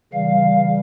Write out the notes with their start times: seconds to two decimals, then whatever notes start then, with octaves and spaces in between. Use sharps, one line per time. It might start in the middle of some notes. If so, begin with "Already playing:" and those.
0.13 C#3 E3 G3 F5